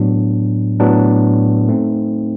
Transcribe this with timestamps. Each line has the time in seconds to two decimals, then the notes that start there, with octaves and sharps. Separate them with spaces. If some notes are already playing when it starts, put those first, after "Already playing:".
Already playing: A2 F#3 B3 D4
0.80 A2 F#3 B3 D4
1.69 A3 C4 D#4